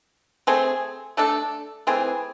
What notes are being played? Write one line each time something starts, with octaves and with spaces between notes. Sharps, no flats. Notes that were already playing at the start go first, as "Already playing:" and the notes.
A3 C4 G#4
A3 D4 A4
E3 A3 C4 G#4